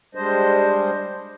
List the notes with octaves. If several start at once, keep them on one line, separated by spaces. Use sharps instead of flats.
G3 G#3 D4 C5 D#5